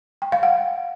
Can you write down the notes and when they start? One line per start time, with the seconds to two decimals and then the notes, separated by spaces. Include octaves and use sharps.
0.22 G5
0.32 F5
0.43 F#5